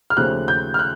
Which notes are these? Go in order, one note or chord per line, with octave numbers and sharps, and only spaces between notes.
F6
D#2 C#3 F3 A3 F#6
G6
F6
F#6